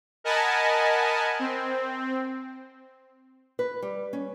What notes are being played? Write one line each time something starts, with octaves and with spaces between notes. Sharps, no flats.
A#4 D#5 F#5 G#5 A5 B5
C4
B4
G3
C#4